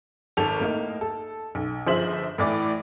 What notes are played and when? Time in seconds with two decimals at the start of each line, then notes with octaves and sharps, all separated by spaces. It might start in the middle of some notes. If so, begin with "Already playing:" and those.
0.37 G#1 A4 F7
0.60 A2 A#3 D#4
1.01 A4
1.55 B1
1.87 G1 F3 G#4 C5 E5 F#7
2.38 A2 E3 D5 D6